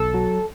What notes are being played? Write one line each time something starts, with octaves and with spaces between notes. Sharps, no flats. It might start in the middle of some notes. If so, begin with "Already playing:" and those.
Already playing: B1 A4
F#3